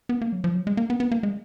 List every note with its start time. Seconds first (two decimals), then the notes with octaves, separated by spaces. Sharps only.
0.09 B3
0.21 A#3
0.32 F#3
0.44 F3
0.55 F#3
0.67 G#3
0.77 A#3
0.90 B3
1.00 B3
1.11 A#3
1.23 G#3